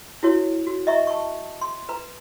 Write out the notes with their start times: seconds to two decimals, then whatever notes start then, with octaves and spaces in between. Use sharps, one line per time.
0.23 E4 F#4 C#5
0.67 F#4
0.87 D#5 E5 A#5 C#6
1.07 A5 C#6
1.61 C6
1.89 B4 A#5